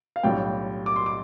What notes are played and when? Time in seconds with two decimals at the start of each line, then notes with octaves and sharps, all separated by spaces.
0.16 F5
0.23 B1 A2 G3 D4 F4 G5
0.86 D6
0.96 C6
1.06 D6